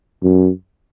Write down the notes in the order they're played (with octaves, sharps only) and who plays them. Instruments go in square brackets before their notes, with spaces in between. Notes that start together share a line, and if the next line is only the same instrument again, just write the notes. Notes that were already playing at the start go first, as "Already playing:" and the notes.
[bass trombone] F#2